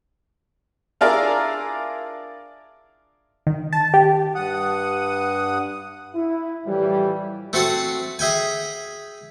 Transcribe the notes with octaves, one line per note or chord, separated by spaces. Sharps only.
D4 E4 F4 G#4 A#4 D5
D#3
A5
G4
G2 F#5 D#6
E4
A2 E3 F3 G3
A3 C4 F#4 F#5 A5
G#4 E5 G5 G#5